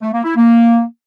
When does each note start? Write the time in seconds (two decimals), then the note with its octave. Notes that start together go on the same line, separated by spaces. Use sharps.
0.01 A3
0.13 A#3
0.24 E4
0.35 A#3